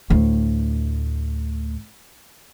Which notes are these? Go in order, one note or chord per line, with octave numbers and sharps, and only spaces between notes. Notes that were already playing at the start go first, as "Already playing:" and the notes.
D2 A2